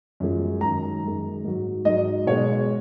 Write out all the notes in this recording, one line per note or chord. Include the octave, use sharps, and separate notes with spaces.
F#2 F3 G#3
F#2 D#3 G#3 A#5
F#2 D#3 G#3
G#2 F#3
G#2 F#3 D#5
B2 G#3 C#5